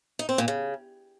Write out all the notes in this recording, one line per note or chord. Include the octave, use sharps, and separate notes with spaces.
D#4
C4
A#2
C#3